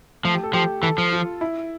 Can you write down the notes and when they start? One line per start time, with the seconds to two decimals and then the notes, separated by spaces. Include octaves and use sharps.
0.24 F3 A3
0.34 G4
0.43 A4
0.53 F3 G4
0.82 E3 A4
0.98 F3
1.12 F4
1.41 E4